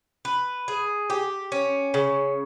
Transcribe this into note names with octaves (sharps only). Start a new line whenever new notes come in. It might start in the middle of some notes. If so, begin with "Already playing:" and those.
B4
G#4
G4
C#4
C#3